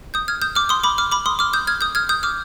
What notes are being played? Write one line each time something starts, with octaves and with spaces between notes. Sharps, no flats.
D#6 G6
F6 G#6
D#6 G6
D6 F6
C6 D#6
B5 D6
D6 F6
B5 D6
C6 D#6
D6 F6
D#6 G6
F6 G#6
D#6 G6
F6 G#6
D#6 G6
D6 F6